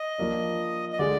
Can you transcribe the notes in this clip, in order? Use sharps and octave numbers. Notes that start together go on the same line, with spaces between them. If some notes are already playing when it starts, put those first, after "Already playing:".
Already playing: D#5
F3 A#3 D4
D#5
D3 G#3 D5